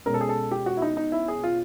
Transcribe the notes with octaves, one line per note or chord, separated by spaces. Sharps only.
B2 G#3 C#4 A#4
A4
G#4
A4
G4
F#4
E4
D#4
D#4
E4
G#4
F4